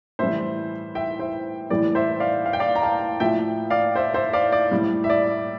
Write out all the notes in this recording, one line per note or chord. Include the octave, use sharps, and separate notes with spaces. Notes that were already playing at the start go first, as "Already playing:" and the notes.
A2 E3 G3 C5 E5
E5 G5
C5 E5
A2 E3 G3 D5
C5 E5
D5 F5
F5
G5
D5 F5
A#5
F5 A5
A2 F3 E5 G5
D5 F5
C5 E5
C5 E5
D5 F5
D5
A2 G3
E5
D5